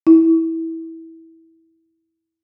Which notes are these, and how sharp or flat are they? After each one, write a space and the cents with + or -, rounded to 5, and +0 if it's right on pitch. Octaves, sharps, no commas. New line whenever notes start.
E4 -15